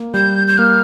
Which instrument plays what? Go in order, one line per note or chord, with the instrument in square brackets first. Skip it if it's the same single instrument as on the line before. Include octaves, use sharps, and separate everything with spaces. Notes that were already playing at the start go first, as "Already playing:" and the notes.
Already playing: [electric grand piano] A#3
[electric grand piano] G3 [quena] G6
[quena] G6
[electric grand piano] A#3 [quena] F6